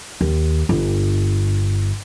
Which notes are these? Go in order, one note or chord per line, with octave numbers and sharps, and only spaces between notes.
D#2
G1